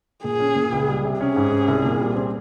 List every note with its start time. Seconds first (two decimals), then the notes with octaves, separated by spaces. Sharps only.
0.24 A#2 G#4
0.40 C#4
0.55 A#2
0.72 C#2
0.88 G3
1.05 C3
1.20 C#4 G#4
1.36 G#2
1.52 C#4
1.68 C2
1.84 A#2
2.00 G3
2.16 C4